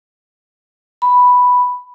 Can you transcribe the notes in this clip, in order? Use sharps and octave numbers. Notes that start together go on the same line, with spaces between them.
B5